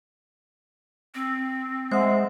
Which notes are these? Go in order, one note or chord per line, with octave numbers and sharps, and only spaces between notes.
C4
G#3 C5 E5 F#5